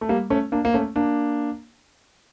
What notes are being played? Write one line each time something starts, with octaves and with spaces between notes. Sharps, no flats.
A3
G3 A#3
A3 C#4
A#3 D4
A#3
A3 C#4
A#3 D4